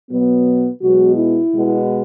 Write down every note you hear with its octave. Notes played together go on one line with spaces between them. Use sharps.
B2 F#3 B3
B2 F#3 G#3 B3 F#4
E4
B2 G#3 B3